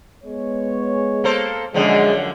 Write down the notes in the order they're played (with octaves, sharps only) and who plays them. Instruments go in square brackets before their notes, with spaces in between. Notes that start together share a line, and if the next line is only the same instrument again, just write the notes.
[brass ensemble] G#3 B3 C#5
[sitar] A#3 A4 C5
[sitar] F#2 D3 F3 [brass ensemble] G#3